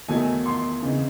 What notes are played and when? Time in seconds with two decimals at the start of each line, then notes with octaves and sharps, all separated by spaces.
0.08 E2 D#3 F#3 A3 G#5
0.46 C6
0.82 C#3 E3 C4 D#4